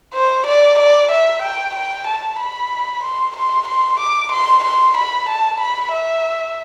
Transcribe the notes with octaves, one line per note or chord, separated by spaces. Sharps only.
C5
D5
D5
E5
G5
G5
A5
B5
C6
C6
C6
D6
C6
C6
B5
A5
B5
E5